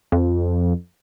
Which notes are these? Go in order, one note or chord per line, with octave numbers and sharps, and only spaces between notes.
F2